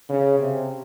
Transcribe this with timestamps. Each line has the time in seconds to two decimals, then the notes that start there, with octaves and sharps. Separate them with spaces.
0.09 C#3
0.39 C3